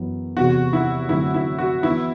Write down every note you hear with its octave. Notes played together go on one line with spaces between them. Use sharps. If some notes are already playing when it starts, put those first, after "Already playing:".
Already playing: F#2 E3 B3
E2 C3 G3 B3 F#4
E4
D3 F#3 A3 C4 E4
E4
F#4
E3 B3 E4 F#4